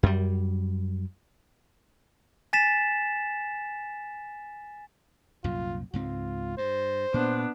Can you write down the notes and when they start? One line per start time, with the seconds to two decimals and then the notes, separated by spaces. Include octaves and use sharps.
0.03 F#2 G3
2.53 G#5 A6 B6 E7
5.44 C2 F#2 A#2 F4
5.94 C#2 G#2 C4 F4
6.58 G2 C5
7.14 A#2 B3 D4